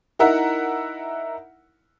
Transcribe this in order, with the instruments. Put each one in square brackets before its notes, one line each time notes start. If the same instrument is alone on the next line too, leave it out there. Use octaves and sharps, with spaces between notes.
[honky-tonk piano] D#4 E4 A#4 E5 F#5